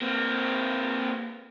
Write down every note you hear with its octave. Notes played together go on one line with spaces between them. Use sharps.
A#3 C4